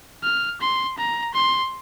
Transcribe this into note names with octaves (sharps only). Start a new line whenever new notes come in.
F6
C6
A#5
C6